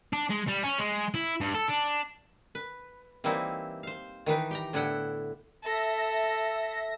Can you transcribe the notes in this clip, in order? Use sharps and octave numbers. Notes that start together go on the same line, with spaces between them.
D4
G#3
G3
C#4
G#3
E4
G2
A4
D4
B4
E3 G3 A#3 C4 D#4 E4
C5 F5
D#3 E3 D#4 B4
G4 G5 A#5
A2 D3 B3 E4 F#5 G5
A4 E5 A#6